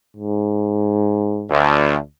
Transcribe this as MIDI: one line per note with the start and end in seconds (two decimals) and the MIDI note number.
0.17 1.50 44
1.50 1.97 38